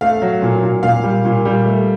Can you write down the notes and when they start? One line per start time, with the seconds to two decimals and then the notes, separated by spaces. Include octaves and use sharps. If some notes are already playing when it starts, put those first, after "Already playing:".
0.01 A3 F5
0.22 F#3
0.42 A#2
0.63 A#2
0.83 A#2 F5
1.04 G3
1.25 A#2
1.45 G3
1.66 A3